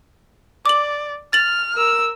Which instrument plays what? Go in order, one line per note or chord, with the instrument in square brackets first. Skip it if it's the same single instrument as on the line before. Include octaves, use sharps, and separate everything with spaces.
[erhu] D5 [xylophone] D6 F#7
[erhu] F6 [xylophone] A6 F#7
[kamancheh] A#4 E6